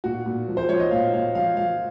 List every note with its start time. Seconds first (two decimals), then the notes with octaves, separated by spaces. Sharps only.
0.04 A#2 F#4
0.26 A#2
0.48 F3
0.57 C5
0.69 F3 C#5
0.80 D#5
0.91 A#2 F5
1.13 A#2 F5
1.35 F3 F5
1.57 F3 F5